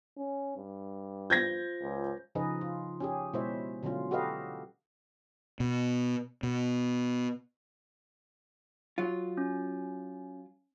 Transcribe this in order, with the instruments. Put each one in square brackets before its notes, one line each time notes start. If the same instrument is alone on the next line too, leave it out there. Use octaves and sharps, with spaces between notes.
[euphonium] C#4
G2
[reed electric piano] F4 C5 [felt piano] G6 G#6 A#6
[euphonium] C#2
[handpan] C#3 F3 D#4 G#4 B4 D#5
F4
C#4 G4 G#4
B2 G#3 E4 C5 C#5 E5
B2 D3 F#3 C#4 F4
F#4 G4 A4 B4 D#5 F5
[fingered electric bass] B2
B2
[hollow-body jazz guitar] F#3 F4
[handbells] C#4